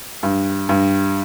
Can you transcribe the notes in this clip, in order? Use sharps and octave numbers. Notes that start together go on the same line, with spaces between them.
G2
G2